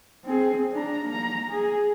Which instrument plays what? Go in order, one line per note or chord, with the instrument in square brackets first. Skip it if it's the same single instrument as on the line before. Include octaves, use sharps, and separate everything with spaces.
[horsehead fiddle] C4 G#4
D4 A#5
A#3 A#5
G#4